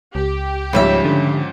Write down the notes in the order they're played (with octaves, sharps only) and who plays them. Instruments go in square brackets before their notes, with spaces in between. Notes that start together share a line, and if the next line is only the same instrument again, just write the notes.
[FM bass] C#2 [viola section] G4
[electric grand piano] G#2 F3 C#4 [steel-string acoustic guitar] C#3 G3 E5
[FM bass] D3